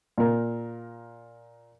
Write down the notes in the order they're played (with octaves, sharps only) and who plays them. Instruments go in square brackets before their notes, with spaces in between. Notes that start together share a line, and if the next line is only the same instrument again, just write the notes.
[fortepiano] A#2 A#4